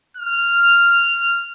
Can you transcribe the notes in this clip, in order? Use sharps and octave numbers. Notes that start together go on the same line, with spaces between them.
F6